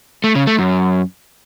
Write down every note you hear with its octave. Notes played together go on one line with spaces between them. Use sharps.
A3
C#3
A3
F#2